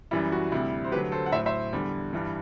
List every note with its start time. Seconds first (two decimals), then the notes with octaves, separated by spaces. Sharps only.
0.11 F#2 E3 G3 E4
0.32 F#4
0.52 D2 C3 G3 E4
0.84 C5
0.92 D2 D3 F#3 G4 B4
1.12 A4 C5
1.26 F#5
1.32 A2 C5 E5
1.35 F#3
1.46 C5 E5
1.73 E2 D3 G3
2.13 G2 E3 G3